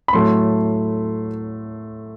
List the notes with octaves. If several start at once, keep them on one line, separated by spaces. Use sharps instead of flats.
B5
A2 F#3 A3 C6